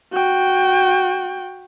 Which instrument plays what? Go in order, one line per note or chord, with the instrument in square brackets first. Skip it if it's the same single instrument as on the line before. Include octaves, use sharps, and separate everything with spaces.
[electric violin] F#4 G5